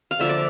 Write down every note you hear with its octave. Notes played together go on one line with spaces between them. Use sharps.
F5
D3 F3 A#3 E5
D5